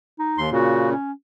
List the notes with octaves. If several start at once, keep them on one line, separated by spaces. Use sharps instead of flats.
D#4
D#2 C6
A#2 C#3 F#4
C#4